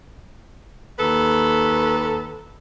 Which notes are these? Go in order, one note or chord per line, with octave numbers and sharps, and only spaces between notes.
D#2 A4 B4